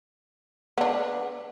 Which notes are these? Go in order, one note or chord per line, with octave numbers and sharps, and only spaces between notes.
B3 D4